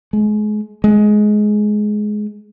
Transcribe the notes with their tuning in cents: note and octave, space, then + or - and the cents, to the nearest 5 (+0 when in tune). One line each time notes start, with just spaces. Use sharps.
G#3 +30
G#3 +15